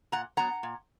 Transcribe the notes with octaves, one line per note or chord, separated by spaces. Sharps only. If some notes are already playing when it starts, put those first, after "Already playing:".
A#2 F#5 A#5
F#3 B3 F#5 A#5
A#2